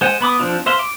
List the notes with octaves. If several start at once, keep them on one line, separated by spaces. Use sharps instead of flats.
G#3 C5 F#5 G#5
B3 B5 D6 D#6
F3 A3 C4 D4 F4
C5 E5 F5 C6
D6